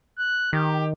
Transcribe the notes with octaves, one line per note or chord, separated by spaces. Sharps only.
F#6
D#3 G4